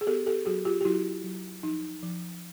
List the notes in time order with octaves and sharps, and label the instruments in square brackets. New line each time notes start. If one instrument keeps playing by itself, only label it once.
[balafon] G#4
B3 G4 A4
G4 A4
F#3 F#4 G#4
F4 G4
G4
F#3 E4 F#4
F#3
F3 D#4
F3